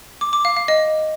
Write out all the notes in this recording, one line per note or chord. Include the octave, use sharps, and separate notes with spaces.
D6
D6
F5
F5
D#5